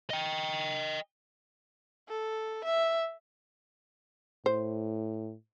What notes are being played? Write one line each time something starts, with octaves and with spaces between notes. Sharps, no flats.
D#5 G5
A4
E5
A2 C5